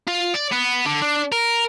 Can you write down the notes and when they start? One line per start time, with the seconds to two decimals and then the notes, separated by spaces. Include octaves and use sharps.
0.07 F4
0.34 D5
0.52 B3
0.86 D3
1.02 D4
1.32 A#4